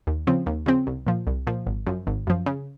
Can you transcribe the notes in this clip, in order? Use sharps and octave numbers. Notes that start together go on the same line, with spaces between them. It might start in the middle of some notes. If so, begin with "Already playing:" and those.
D#2
C#3 F3 C4
D#2
C#3 F3 C4
C2
A#2 F3
C2
A#2 F3
G#1
F#2 F3
G#1
F#2 F3
C#3